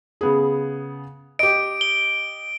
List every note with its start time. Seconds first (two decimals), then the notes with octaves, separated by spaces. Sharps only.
0.21 C#3 B3 G#4
1.39 G4 D#5 D7
1.81 G7